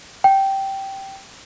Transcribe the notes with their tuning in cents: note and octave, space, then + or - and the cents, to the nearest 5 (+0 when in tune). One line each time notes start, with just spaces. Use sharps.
G5 -10